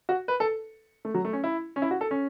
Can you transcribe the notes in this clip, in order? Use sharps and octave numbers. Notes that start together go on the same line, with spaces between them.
F#4
B4
A4
A3
F#3
A3
C#4
E4
C#4
E4
F#4
A4
C#4